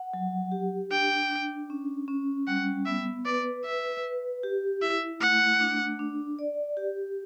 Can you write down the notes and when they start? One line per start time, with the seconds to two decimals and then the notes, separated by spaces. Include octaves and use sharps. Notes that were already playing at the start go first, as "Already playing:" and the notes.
Already playing: F#5
0.13 F#3
0.52 G4
0.91 D4 G5
1.31 D4
1.70 C#4
2.08 C#4
2.47 G3 F#5
2.86 B3 E5
3.25 B4 D5
3.64 B4 E5
4.04 B4
4.43 G4
4.81 E4 E5
5.20 A3 F#5
5.60 D4
5.99 D4
6.39 D5
6.77 G4